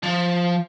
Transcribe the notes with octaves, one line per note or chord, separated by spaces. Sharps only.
F3